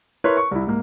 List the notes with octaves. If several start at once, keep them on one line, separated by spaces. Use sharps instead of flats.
E4 A#4 B4 C#5 C6
C#6
C2 E4
G#2 A#3